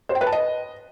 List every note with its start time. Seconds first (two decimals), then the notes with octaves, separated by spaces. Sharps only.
0.09 C5
0.15 G5
0.21 B4
0.27 A5
0.32 D#5